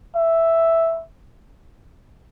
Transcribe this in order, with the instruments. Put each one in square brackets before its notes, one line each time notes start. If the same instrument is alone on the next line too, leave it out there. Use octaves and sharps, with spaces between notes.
[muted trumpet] E5